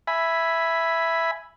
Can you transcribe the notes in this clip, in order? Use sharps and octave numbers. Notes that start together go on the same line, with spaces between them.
E5 G#5 B5